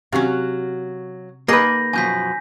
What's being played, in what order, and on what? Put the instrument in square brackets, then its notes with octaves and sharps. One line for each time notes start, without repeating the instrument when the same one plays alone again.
[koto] C3 C#4 [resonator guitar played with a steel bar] F#3 F#4 F5
[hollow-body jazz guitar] A#3 B4 [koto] D#4 G#4 D#5 [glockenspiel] G6 A#6
[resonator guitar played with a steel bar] F#2 B2 F3 [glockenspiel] G#5 G6 B6